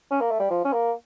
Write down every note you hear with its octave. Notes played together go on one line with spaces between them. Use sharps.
C#4
A#3
A3
G3
F3
C#4
A#3